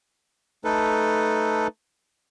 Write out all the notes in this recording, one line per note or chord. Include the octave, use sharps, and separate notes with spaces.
A3 D#4 A4 B4